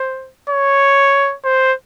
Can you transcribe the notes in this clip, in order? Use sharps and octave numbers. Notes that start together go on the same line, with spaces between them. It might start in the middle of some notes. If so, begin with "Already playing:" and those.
Already playing: C5
C#5
C5